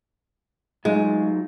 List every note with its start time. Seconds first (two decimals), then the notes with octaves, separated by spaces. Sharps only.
0.85 F#3 G#3 D#4 F4